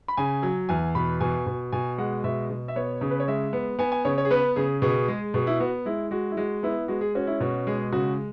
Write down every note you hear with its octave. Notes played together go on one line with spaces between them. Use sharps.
B5
C#3 G#5
F#3
E2 G#5
B2 B5
B2 G#5
B2
B2 G#5
G#3 F#5
B2 E5
B2
E5
B3 C#5
C#3
B4
C#5
G#3 E5
B3
B3 G#5
G#5
C#3 C#5
C#5
G#4
B3 B4
C#3 G#4
B2 G#4
G#3
B2 G#4
E4
B3 F#4
G#3 E4
G#3 F#4
E4
G#3 F#4
B3 E4
G#3 F#4
G#4
C#4 F#4
E4
B2 F#4
G#3 G#4
C#3 F#4